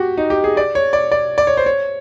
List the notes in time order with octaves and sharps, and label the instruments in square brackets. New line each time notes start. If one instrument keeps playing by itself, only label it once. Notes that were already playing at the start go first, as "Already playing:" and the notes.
Already playing: [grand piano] F#4 G4
D#4
G4
G#4
D5
C#5
D5
D5
D5
C#5
C5
C#5